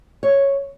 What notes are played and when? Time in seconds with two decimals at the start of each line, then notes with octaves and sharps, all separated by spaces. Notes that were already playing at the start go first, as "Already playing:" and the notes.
0.23 C#5